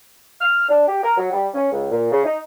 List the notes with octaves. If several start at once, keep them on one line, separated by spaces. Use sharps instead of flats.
F6
D4
G4
A#4
F#3
G3
C#4
C#2
A#2
C#3
D#4